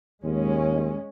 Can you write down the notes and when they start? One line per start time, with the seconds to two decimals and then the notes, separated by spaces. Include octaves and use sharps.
0.24 D#2 G#3 C#4